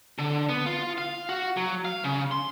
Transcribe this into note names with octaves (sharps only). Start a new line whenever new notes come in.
D3
B3
F4
F5
F#4
F#3
F5
C#3
C6